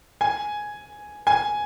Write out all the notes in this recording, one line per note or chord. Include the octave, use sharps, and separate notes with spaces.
G#5
G#5